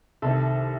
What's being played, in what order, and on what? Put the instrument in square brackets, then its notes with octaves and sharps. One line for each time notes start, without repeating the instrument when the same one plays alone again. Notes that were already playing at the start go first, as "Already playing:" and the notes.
[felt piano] C2 C3 D#3 A4